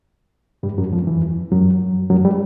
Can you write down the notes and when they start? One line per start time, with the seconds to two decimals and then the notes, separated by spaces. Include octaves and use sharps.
0.63 G2 G3
0.78 F#2 F#3
0.93 F2 F3
1.07 E2 E3
1.51 F#2 F#3
2.10 F#2 F#3
2.25 G3